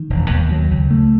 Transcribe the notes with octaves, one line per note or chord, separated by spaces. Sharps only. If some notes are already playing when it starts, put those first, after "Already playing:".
Already playing: D#3
E1
D#2
F#3
C#2
A3